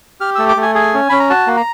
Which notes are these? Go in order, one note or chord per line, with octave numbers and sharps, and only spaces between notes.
G4 F6
A3 E6
D6
A3
G#5
G#4 G#5
C#4
C#4 B5
A#5
F#4 A5
A#3
A#5